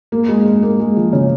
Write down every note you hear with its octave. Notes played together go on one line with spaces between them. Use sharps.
A#3
G#3
G#3
A#3
G#3
F3
C#3